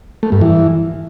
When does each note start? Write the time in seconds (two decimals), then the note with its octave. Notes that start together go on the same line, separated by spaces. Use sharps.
0.23 A3
0.32 G2
0.41 E3